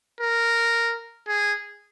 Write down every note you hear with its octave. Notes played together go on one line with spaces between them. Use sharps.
A#4
G#4